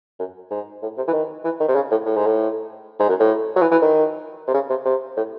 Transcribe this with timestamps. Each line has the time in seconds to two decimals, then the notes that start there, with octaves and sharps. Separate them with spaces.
0.20 F#2
0.51 G#2
0.82 A2
0.97 C3
1.08 E3
1.13 D#3
1.44 E3
1.60 D#3
1.68 C3
1.75 C#3
1.91 A2
2.06 A2
2.17 G#2
2.26 A2
3.00 G#2
3.09 F#2
3.20 A2
3.56 F#3
3.62 E3
3.72 E3
3.82 D#3
4.47 C3
4.54 C#3
4.70 C3
4.86 C3
5.17 A2